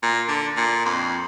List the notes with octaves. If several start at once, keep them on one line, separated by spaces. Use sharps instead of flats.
A#2
D3
A#2
F2